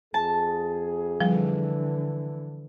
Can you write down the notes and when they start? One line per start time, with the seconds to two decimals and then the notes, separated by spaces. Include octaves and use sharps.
0.14 F2 G#4 A5
1.21 D3 E3 F3 G3